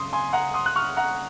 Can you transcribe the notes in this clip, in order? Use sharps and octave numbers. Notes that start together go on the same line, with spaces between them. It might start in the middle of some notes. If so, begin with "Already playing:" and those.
Already playing: C#2 C#3 F#3 C6 D#6
G#5 C6
C6
F#5 A#5
C6 D#6
F#6
C#6 F6
F#5 A#5